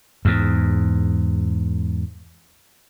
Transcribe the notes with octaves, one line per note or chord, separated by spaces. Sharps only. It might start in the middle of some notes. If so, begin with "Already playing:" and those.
E2 G#2